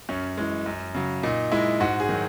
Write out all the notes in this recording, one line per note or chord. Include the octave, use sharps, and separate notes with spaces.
F#2 C#4
E3 G#3
F#2
C#3 F#3
A#2 D#4
G#3 E4
G#2 F#4
G#4
D#3 F#3